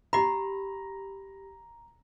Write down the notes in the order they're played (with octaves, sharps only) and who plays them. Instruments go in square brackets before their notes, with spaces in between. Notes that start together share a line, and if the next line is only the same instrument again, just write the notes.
[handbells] G4 B5 [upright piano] A#5